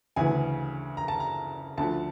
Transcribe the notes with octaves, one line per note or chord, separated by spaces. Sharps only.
D2 C#3 E3 G#5
A#5
A5
A#5
D2 D3 F3 A5